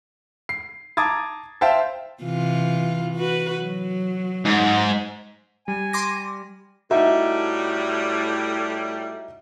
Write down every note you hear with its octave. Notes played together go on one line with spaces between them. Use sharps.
C7
A5 A#5 D6 D#6 G#6 A6
C5 E5 F5 G5 A5 A6
C3 E3 F4
F#4 B4
F#3
G#2
G3 G#5
C6 D6 A#6
A2 G3 D#4 F#4 E5